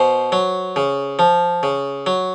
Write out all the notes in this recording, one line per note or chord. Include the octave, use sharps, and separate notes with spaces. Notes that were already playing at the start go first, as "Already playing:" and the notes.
Already playing: B2 C5
F#3
C#3
F3
C#3
F#3